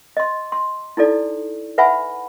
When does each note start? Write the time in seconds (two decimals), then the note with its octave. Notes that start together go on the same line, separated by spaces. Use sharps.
0.17 D#5 C6
0.52 C6
0.97 D#4 E4 A4 D5
1.78 B4 E5 F#5 G#5 B5